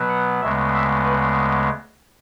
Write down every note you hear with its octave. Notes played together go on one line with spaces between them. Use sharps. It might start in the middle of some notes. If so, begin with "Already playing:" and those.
Already playing: B2 F#3 B3
F#5
D2 C#3 G#3 B3 E5
E5
B4